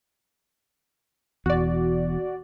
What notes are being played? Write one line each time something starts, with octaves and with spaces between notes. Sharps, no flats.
E1 E2 F#4 D5